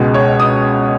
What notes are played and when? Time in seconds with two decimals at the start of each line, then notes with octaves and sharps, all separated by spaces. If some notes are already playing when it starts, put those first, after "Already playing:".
Already playing: C#2 B2 G#3
0.14 C#5
0.40 D#6